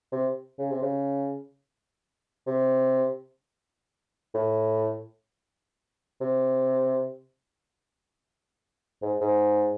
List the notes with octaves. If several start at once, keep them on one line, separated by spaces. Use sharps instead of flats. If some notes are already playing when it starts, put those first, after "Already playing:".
C3
C#3
C3
C#3
C3
A2
C3
G#2
G#2